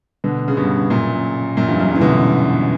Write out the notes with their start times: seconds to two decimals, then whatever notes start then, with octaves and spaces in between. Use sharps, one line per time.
0.24 B2 D3
0.48 C#3
0.57 G2 B2
0.90 F#2 A#2
1.57 F#2 A#2
1.68 E2 G2
1.79 F#2
1.90 F#2
1.95 E3
2.01 B2 D3